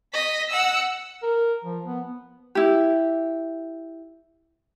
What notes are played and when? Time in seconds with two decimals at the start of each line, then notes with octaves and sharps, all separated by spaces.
0.14 D#5 B6
0.50 F#5 E6
1.23 A#4
1.64 F3
1.85 B3
2.55 E4 G4